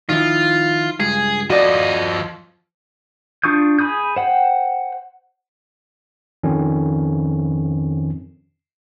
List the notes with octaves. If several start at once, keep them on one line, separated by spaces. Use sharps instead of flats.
D#3 F3 E4 F4
C#2 G2 G#4
F3 F#4 D5 D#5
D4 F4 C#6 D#6 G6
G#4 B5 D#6 G6
C5 F#5 G5
F2 D#3 C#4